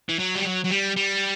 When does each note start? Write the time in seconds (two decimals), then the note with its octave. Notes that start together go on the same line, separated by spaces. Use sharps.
0.09 E3
0.19 F#3
0.35 G3
0.45 F#3
0.65 F#3
0.71 G3
0.96 G3